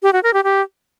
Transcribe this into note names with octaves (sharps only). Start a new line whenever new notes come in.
G4
F#4
A#4
G4
G4